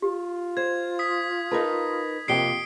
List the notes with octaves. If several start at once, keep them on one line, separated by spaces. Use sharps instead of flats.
F4 G4
C5 G#6
D#6 B6
D#4 A#4 B4 A5
F2 C3 A#3 G4 C7 D7 G7